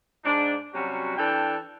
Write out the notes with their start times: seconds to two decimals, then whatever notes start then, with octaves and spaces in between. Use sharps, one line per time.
0.25 G#2 D4
0.74 C3 F#3 G3 C#4 F#4
1.18 E3 D4 A4 G5